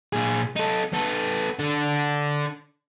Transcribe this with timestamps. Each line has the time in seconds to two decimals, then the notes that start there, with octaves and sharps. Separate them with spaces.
0.13 A#2 G#4
0.56 D#4 A4
0.93 B3 A4
1.59 D4 A4